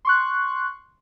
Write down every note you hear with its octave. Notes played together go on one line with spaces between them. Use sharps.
C6 C#6 F#6